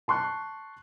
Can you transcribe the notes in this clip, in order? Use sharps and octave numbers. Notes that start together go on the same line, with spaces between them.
A5 C6 C#6 F#6